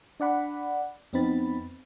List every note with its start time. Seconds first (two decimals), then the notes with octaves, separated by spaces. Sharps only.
0.20 D4 D5 F#5 B5
1.13 F2 B3 C4 D#4 B5 A6